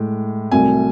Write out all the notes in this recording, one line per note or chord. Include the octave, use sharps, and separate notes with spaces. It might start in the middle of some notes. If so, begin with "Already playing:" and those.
Already playing: A2 G#3
C2 C3 F#3 A3 G#5